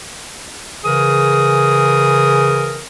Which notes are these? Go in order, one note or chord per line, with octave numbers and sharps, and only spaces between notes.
C#3 E3 G#4 A#4 D#6